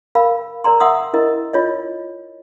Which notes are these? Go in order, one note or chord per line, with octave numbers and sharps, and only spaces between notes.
A#4 F5 B5
A#4 D5 A#5 C6
E5 F#5 C6 D#6 E6
E4 A#4 D#5
F4 C#5 D#5